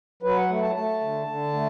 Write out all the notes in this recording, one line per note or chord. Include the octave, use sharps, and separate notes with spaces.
F#3 B4
F#5
A3
A5
A3 A5
D3
D3
A3